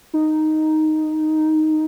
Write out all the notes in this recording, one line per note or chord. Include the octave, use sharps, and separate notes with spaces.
D#4